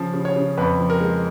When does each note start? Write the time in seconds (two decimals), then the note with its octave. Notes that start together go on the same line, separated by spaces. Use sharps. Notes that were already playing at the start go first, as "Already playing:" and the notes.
Already playing: C#3 F3
0.13 C#3
0.25 C#5
0.36 C#3
0.57 F2 B4
0.79 F3
0.90 A#4
1.01 G#3